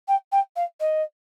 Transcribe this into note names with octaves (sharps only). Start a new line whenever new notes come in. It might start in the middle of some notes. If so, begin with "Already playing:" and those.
G5
G5
F5
D#5